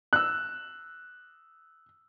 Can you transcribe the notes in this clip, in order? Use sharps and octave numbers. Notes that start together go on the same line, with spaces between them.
E6 F#6